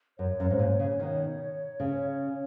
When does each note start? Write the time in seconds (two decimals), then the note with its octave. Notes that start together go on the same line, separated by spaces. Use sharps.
0.19 F#2 C#5
0.40 F#2
0.50 G#2
0.59 A#2
0.80 C#3
0.99 B2 D#3
1.80 C#3